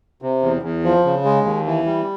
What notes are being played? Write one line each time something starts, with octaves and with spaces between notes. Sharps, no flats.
C3
E2
E2
F3
C#3
G#3
D#2
E3
G3